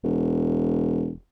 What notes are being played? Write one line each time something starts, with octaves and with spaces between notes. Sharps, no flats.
E1